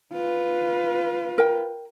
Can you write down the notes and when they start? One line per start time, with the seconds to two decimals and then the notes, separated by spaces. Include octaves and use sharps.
0.13 F4 B4
1.38 A#4 G5